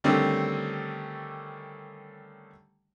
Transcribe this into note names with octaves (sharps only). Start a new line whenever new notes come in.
D3 D#3 G3 A3 C4 C#4